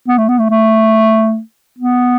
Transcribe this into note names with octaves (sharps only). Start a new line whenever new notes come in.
B3
A3
B3
A3
A3
B3